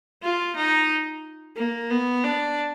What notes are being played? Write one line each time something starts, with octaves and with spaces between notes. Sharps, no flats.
F4
D#4
A#3
B3
D4